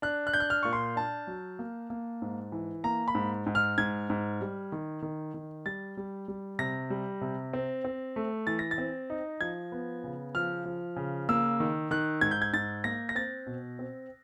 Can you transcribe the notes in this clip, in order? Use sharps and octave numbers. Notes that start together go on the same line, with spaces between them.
D4 F#6
F#6
D4 G6
F#6
F6
A#2 C#6
C6
D4 A5
F#3
A#3
A#3
G#2
E3
A#3 A#5
B5
G#2
G#2
F6
G#2 G#6
G#2
G3
D#3
D#3
D#3
G3 A6
G3
G3
C3 A#6
G3
C3
C4
C4
A3
E3 A6
A#6
A6
C4
D#4
F3 G#6
B3
C#3
F3 F6
F3
C#3
A#3 E6
D#3
D#3 F#6
G#2 G#6
G6
G#6
G#2 A6
A#3 A#6
A#6
C4 A6
B2
C4